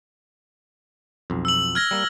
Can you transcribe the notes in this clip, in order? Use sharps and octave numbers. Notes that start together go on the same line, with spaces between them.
B1 F2
E6 F#7
F6 G#6 A#6
G3 A#3